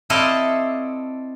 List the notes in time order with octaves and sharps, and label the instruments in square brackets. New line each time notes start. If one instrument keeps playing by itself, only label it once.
[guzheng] C4 E4 A4 D5 D#5 F5